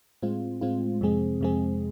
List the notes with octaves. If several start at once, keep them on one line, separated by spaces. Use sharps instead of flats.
A2 G#3 C4 F4
A2 G#3 C4 F4
F2 C3 G#3 C4 G#4
F2 C3 G#3 C4 G#4